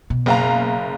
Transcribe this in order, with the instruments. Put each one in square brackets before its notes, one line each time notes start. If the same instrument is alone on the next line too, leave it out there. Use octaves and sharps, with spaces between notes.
[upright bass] B2
[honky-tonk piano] F#1 F5 A#5